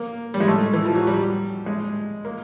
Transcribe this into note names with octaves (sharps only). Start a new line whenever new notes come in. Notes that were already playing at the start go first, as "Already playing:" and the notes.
Already playing: A#3
G3
G#3
A3
E3
F3
F#3
G3
G#3
A#3